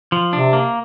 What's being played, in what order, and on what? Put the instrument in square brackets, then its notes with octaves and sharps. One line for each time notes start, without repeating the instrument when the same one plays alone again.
[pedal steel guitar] F3
[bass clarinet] C3 [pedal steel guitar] D4
[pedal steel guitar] A#3